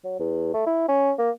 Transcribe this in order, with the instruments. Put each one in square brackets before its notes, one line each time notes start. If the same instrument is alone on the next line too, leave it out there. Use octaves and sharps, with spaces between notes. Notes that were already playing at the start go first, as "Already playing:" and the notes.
[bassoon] F#3
E2
A3
E4
C#4
A#3